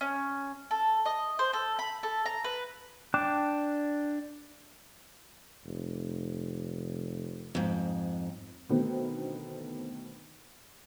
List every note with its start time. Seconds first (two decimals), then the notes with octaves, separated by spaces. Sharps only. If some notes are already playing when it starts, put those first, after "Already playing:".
0.01 C#4
0.71 A4
1.06 D#5
1.39 C5
1.53 A4
1.79 B5
2.03 A4
2.26 A#5
2.44 B4
3.14 D4 G5 A5 D6 F#6
5.65 F1
7.55 F2 G#2
8.69 B2 D3 D#3 A3 B3 C4